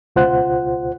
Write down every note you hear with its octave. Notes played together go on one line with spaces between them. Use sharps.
C#2 B2 F4 C5 F#5 F#6